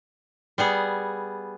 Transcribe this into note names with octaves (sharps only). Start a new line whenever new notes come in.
G3 B3 G#4